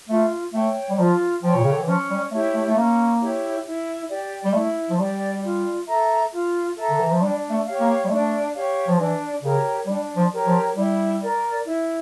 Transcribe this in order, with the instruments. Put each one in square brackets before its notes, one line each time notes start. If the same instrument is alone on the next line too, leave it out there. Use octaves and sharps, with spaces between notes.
[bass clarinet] A3 [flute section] F4
[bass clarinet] A3 [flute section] C#5 G5
[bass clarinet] G3
[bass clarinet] F3 [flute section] F4
[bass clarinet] F3 [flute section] C#5 G5
[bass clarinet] A#2
C#3
D3
E3
[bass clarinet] F3 [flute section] C#4
[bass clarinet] G3
[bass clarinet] A3 [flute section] E4 G4 C#5
[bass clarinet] A3
A3
[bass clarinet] A#3 [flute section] C#4
[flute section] E4 G4 C#5
E4
G4 D5
[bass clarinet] G3
[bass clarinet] A3 [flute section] E4
[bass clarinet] F3
[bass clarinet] G3 [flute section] G4 D5
[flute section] F4
A4 E5 A#5
F4
A4 E5 A#5
[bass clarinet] D3
E3
F3
[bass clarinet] G3 [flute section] D4
[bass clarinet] A3
[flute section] G4 C#5 F5
[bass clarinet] A#3
G3
[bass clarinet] A3 [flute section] D4
[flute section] G4 C#5 F5
[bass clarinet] F3
[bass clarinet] E3 [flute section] D4
[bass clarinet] C#3 [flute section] G4 A#4 C#5
[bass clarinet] G3 [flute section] D4
[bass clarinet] F3
[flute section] G4 A#4 C#5
[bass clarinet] F3
[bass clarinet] G3 [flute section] E4
[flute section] A#4 D5
E4